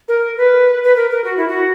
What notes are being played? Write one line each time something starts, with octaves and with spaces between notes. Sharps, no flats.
A#4
B4
B4
A#4
A#4
F#4
E4
F#4